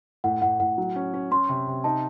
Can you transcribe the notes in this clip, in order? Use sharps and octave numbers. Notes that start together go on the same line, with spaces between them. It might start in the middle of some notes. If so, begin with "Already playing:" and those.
A2 F#5
A2 F#5
A2 F#5
F#3
C#4
C#4
C#4 C6
C3
C3
D#4 A5